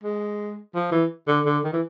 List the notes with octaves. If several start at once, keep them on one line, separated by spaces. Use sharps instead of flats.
G#3
F3
E3
D3
D3
D#3
E3